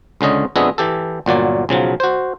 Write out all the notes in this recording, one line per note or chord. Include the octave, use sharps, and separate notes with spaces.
C#2 D3 C#4 D#5
F2 B3 D4 G#4 D#5 E5
E3 G4 A4
G1 A#2 F#3 D5
B1 C#3 F3 F#3
F#4 C5